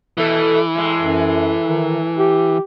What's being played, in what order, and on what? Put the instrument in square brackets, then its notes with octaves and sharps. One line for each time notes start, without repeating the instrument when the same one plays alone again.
[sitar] B2 A3 A4 [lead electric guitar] E3
[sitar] A2 G#3
[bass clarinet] F#2
D#3
G4